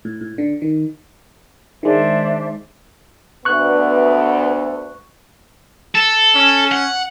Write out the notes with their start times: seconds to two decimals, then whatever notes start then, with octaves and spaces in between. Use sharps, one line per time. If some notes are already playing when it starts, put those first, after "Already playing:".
0.05 A2
0.21 A2
0.38 D3
0.62 D#3
1.83 D#3 G#3 D4 C5 E5
3.45 D2 B3 C#6 F#6
5.95 A4
6.35 C#4
6.72 F#5